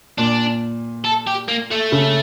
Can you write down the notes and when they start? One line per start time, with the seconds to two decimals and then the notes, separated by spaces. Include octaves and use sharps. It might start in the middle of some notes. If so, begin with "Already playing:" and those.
0.18 A#2 D4
1.05 A4
1.27 G4
1.49 A#3
1.71 A3
1.92 C#3